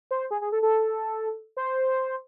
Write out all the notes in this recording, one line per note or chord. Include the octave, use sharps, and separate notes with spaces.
C5
G#4
G#4
A4
A4
C5